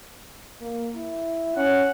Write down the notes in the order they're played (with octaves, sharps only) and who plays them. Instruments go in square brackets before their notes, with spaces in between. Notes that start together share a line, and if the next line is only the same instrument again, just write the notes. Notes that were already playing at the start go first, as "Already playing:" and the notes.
[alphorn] A#3
E4
[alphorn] C#4 [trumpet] F#5